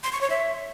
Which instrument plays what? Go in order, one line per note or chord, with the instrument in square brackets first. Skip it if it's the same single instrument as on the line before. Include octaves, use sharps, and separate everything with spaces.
[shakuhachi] C6
C#6
C#5
E5